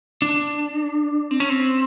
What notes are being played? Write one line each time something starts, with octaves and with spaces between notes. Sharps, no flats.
D4
C4
C#4
C4